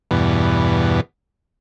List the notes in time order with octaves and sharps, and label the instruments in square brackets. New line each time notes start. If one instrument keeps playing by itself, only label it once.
[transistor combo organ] E2 G2 B2